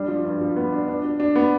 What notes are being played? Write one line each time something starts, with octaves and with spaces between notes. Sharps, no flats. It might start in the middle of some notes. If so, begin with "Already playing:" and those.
Already playing: G3 D4
F3
G2
F3
B3
D4
D4
D4
D4
B3